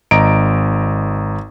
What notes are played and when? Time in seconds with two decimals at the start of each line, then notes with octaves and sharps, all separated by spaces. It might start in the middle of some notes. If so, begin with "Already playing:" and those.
0.11 G#1 D#5 A#5 D7